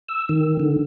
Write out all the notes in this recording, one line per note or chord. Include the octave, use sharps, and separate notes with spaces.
E6
D#3
D3